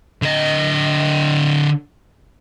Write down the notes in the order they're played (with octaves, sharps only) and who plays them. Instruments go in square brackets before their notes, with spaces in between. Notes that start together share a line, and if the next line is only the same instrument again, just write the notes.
[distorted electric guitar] D3 D#5